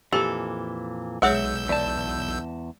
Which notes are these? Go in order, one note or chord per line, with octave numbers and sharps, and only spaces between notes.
F2 A#2 E3 G4 A4
B1 G#3 G#4 C#5 E5 F#5 E6 G6
E2 D5 A5